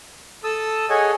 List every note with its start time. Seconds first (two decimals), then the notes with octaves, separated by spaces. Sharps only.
0.44 A4 A5 D#6 E6
0.90 G#4 A4 C#5 D#5 F#5 G#5